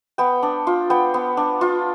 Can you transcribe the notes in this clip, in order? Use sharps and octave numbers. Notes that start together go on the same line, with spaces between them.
B3 G5
D4
F4
B3 G5
B3
D4
F4